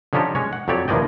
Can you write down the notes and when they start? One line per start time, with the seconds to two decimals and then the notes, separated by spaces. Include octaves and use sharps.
0.13 D3 F3 C#4 D#4 G4 A4
0.35 G#3 C#4 C#5
0.53 F#5
0.68 F2 F#3 G4 C#5 D5
0.88 D#2 E3 F3 D5 D#5 G5